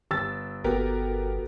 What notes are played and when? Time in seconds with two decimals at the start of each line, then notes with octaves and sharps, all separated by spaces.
0.11 G1 E6 A6
0.64 G1 B3 F#4 G4 A4 A#4